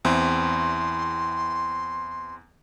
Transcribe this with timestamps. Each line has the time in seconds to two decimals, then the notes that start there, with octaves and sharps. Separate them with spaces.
0.05 E2 C4 E4 C6